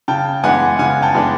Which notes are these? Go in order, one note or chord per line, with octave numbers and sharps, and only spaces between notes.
C#3 G5 A5
E3 G#3 B3 D4 F#5 G#5
C#3 F#5 G#5
G5 A5
E3 G#3 B3 D4